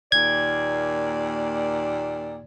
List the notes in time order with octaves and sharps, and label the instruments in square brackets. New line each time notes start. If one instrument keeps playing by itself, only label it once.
[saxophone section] D#2 A#2 D5 [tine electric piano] G#6